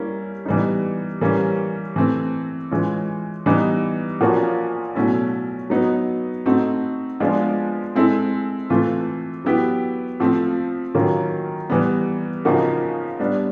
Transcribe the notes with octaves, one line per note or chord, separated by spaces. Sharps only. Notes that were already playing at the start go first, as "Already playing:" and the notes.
Already playing: G3 A#3 C#4 E4
E3 G3 B3 D#4
E3 G3 A#3 C#4
E3 A3 C4
E3 G#3 C#4 F4
E3 G3 B3 D#4
A#2 F3 A#3 C#4 F#4
B2 F#3 A3 C#4 E4
F#3 B3 D#4
A3 C4 D#4 F#4
F3 G#3 B3 D4 F4
G#3 C4 E4 A4
E3 A3 C4 F4
F#3 B3 E4 G4
F3 A3 C4
D#3 F#3 A#3 C#4 F4
E3 G3 B3
C#3 F3 A#3 D#4 F#4
G3 B3 D4